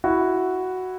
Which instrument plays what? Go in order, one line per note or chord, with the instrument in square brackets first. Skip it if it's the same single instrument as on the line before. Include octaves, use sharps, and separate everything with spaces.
[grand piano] E4 F#4